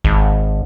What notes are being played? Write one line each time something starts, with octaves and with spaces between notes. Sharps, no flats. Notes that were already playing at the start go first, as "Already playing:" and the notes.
G#1